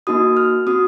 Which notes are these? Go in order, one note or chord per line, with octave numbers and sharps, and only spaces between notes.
A#3 D#4 F#4 D#6
F6
C4 F#4 D#6